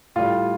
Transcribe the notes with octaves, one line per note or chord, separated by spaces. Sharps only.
A2 G3 F4